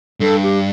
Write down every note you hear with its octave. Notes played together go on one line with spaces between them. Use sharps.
G2 A4
G4